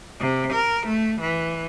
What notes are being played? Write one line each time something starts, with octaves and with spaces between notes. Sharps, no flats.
C3
A#4
A3
E3